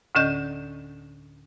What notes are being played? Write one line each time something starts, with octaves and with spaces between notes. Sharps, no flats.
D2 A2 D3 C#4 D#5 G6